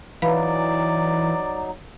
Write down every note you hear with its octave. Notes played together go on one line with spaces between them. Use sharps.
E3 F#3 D#4 B4 D5 F5 B5